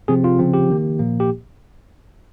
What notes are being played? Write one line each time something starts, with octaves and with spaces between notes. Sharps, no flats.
C3 F3 C4 G#4
F4
C#3 F3 C4
G4
D#3 A#3
A#2 F3 A#3
G4